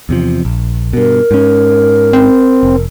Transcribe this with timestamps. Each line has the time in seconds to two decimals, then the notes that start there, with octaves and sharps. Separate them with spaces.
0.09 E2 C3 F3
0.45 A#1
0.93 G2 B2 A#4
1.31 G#2 C#4
2.13 C4
2.63 F1